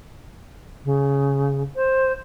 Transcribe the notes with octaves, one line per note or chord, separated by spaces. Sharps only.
C#3
C5